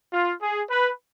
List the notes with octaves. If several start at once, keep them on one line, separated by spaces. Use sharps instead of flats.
F4
G#4
B4